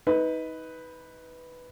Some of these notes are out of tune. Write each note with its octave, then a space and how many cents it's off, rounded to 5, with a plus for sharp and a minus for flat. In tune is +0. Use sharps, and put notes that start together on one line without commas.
D#4 +30 B4 +0